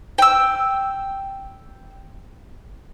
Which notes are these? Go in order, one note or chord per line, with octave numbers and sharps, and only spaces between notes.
G5 E6